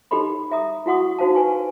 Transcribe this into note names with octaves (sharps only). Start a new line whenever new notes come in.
D#4 G4 A4 D#5 B5 C6
E5 A#5 D#6
E4 F#4 F#5 C#6 D#6
D#4 F#4 C5 F5 A5
B4 G#5 C#6